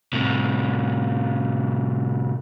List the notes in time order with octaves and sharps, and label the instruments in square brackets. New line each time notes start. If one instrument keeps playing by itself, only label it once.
[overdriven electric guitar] A2 C3